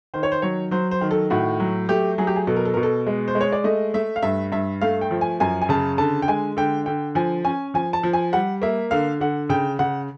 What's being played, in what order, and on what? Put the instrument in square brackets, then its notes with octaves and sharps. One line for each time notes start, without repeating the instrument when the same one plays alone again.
[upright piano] D#3 C5
C#5
C5
F#3 C#5
F#3 C5
C5
D#3
A4
A2 F#4
F#3
A3 G4
F#3 G#4
G4
G#4
B2 A4
A#4
A4
B2 A#4
A4
G#3
C5
G#3
C#5
D5
A3 D#5
A3 E5
F5
G2 E5
G2 E5
A3 F5
G5
F3
G#5
F#2 G#5
G#5
C#3 A5
D3 A5
G5
G#3 G#5
D3 G5
D3 G5
F3 G#5
C#4 G#5
F3 G#5
A5
F3
G#5
G3 F#5
A#3 E5
D3 F5
D3 F#5
C#3 G5
C#3 F#5